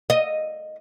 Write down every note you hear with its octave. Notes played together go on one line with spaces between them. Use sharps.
D#5